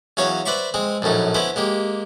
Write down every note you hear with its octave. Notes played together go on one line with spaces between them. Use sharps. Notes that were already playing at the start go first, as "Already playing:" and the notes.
E2 F#3 C#4 C#5 F5
B4 C5 D5 E5 B5 C#6
G#3 C4 G#4
A#1 F#2 A2 C#4 D#4
B3 C#4 E4 B4 C5
G#3 A#3 G4